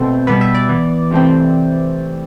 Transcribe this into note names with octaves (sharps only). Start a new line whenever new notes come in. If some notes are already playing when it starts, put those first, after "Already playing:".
Already playing: B2 A3 C4 A4
B2 G3 B3 B4
E5
D5
E3 B3
C3 E3 A3 C4